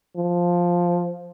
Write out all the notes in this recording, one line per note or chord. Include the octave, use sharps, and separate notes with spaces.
F3